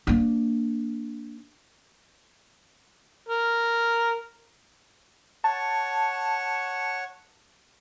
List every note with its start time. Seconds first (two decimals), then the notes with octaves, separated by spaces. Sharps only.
0.07 A#3 D4
3.29 A#4
5.44 C#5 F#5 A5 C#6